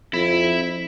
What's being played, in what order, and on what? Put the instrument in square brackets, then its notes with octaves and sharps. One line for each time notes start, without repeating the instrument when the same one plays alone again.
[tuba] F2 [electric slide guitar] E4